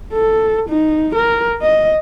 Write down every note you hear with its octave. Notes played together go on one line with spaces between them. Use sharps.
A4
D#4
A#4
D#5